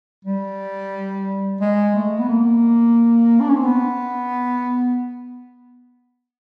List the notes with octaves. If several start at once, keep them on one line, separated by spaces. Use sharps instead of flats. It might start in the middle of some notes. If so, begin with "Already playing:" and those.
G3
G#3
A3
B3
A#3
D4
C#4
C4
B3